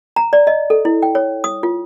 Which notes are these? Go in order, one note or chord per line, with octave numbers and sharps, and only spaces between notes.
A#5
D5
D#5
A4
E4
G5
C#5
D#6
F4